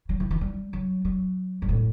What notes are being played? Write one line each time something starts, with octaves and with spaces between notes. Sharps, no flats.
F#3
E3
E3
G3
F#3
F#3
G2
A2